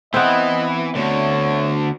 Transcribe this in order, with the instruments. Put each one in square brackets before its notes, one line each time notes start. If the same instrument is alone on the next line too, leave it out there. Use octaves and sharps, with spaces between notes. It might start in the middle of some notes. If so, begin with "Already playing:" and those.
[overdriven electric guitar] E3 [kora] B3 C4 [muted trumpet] D#5
[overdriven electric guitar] D2 D3 [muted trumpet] C#5